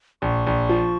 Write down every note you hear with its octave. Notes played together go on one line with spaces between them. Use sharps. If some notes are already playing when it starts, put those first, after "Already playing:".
A#1 C#6
A#1
F3